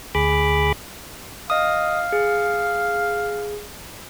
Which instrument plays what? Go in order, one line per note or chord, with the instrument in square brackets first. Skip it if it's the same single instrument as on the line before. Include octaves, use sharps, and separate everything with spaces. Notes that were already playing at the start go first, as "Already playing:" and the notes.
[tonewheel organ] D2 G#4 B5 D6
[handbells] D#5 D#6 [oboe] F5
[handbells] G#4